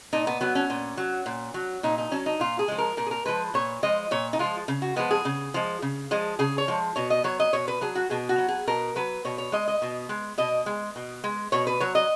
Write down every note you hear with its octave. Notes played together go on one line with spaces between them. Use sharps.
A#2 D#4
B3
F#3 B3
C#4
A#2
F#3
A#2
F#3
A#2 D#4
D#4
F#3 C#4
D#4
A#2 F4
G#4
F3 G#3
A#4
A#2 A#4
G#4
A#4
F3 G#3 B4
A#2 C#5
F3 G#3 D#5
A#2 C#5
D#4
F3 G#3 F4
C#3
F#4
F3 G#3 B3
G#4
C#3
F3 G#3
C#3
F3 G#3
C#3 G#4
C#5
F3 G#3
B2 C#5
D#5
F#3 C#5
D#5
B2 C#5
B4
F#3 G#4
F#4
B2 G#4
F#4
F#3
G#4
B2 A#4
F#3 B4
B2 C#5
C#5
G#3 D#5
D#5
B2
G#3
B2 D#5
G#3
B2
G#3
B2 C#5
B4
F#3 C#5
D#5